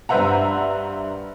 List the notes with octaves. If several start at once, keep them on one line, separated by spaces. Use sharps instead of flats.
G2 B4 C5 E5 F#5 A#5